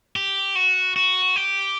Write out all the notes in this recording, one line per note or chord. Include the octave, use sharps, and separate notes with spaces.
G4
F#4
F#4
G4